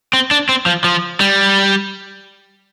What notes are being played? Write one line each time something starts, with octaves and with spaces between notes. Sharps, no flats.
C4
D4
C4
F3
F3
G3